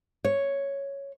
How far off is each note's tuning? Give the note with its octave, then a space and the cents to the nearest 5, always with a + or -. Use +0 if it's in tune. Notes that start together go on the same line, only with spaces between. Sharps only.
C#5 +0